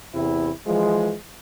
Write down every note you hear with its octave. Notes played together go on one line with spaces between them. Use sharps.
E2 C3 E4
E3 F3 G#3